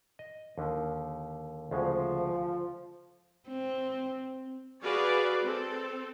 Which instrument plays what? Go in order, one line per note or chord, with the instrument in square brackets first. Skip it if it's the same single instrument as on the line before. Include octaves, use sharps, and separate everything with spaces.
[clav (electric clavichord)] D#5
D#2 D3 D#3
[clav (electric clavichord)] D2 C#3 G#3 [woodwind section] F3
[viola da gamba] C4
[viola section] F#4 G#4 B4 D5 F5
C4 A4